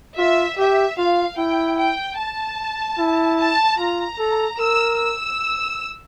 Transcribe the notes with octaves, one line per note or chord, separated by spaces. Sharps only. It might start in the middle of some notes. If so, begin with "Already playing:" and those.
F4 E5
G4 E5
F4 F5
E4 G5
G5
A5
E4
A5
F4 A#5
A4
A#4 E6
E6